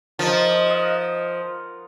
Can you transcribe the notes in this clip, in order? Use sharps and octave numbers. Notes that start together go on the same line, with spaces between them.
F3 D#4 A#4
D#6
D#5 F5 F#5